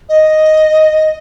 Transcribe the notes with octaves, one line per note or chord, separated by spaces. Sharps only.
D#5